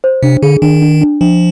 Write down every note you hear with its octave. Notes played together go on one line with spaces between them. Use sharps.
C5
C3 D4
D3 G#4
D#3 D4
D4
D4
F3 D4